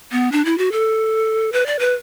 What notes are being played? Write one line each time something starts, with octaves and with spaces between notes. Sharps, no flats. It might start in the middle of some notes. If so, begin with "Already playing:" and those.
B3
D4
E4
F#4
A4
B4
D5
B4